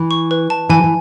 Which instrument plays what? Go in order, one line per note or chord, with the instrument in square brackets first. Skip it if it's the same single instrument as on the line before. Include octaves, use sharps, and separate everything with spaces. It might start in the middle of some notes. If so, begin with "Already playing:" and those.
Already playing: [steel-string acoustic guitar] E3
[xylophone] C#6
B4
A5
[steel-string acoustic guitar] E3 [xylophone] G#5
[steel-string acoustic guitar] E3